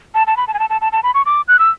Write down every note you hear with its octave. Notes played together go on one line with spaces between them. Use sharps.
A5
A5
B5
A5
G#5
A5
A5
A5
A5
B5
C#6
D6
F#6
E6